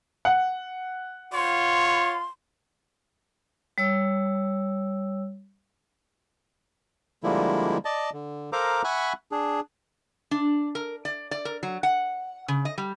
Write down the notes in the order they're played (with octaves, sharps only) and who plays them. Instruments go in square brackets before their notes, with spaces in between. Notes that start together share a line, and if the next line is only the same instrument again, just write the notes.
[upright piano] F#5
[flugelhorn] F4 [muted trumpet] C#5 [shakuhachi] C6
[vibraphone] G3 C#5 E6
[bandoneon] D3 F3 G3 G#3 A#3 E4
D5 D#5 A5
D3
A4 A#4 C5 F5 A#5 D6
E5 F#5 G#5 B5 C#6 F#6
D4 G#4
[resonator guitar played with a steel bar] D4
A#4
D5
D5
A#4
F#3
F#5
C#3
D#5
G3